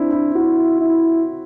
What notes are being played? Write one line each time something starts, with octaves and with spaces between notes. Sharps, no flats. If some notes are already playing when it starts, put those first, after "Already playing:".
Already playing: C4 D4 E4
E4
E4 F#4
E4